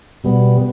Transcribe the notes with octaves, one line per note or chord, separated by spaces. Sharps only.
B2 G3 B3